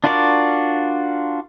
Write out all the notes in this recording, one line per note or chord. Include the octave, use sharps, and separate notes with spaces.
D4 F4 F#4 A#4 D5